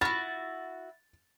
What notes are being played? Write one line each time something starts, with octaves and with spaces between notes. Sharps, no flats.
E4 F#4 F#5 B5 F6 A6